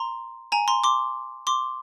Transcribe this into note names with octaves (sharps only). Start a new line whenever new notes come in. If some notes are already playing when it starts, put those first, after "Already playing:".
Already playing: A#5 C6
G#5 A#5
A#5 C6
C6 D6
C6 D6